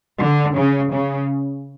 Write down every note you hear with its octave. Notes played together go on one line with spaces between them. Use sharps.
D3
C#3
C#3